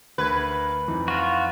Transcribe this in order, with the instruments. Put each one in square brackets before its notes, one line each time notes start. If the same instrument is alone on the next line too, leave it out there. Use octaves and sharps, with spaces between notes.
[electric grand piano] D2 A#4 G#6 [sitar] B4
[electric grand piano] F2 E3 D#4
[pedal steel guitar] F4 F#4